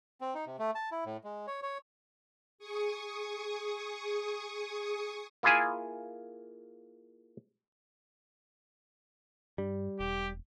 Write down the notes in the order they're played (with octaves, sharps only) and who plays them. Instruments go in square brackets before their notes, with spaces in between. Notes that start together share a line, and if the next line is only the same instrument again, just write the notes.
[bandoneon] C4
D#4
C3
A3
A5
E4
A2
G#3
C#5
C#5
[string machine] G#4 C#6 D#6
[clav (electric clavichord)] A#3 E4 F4 G#4 E5 G#5
[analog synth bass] G2 [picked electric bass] G3
[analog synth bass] E1 [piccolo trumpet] G4